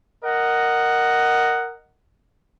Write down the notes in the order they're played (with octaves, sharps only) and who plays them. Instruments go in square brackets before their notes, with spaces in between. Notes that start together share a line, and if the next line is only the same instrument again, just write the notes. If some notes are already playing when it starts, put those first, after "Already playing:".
[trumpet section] A#4 D#5 F#5